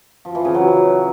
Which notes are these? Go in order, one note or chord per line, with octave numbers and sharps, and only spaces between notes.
F3
E3
C#3
F#3